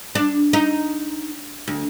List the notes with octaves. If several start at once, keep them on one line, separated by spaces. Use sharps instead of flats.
D4
D#4
D2